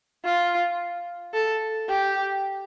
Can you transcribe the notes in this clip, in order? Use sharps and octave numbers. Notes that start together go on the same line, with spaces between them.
F4
A4
G4